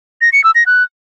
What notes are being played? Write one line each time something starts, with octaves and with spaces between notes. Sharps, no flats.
A#6
C#7
E6
A#6
F#6